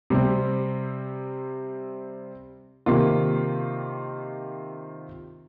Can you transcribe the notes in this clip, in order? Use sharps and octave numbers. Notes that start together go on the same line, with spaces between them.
C3 G3 C4
C3 D#3 A#3 F4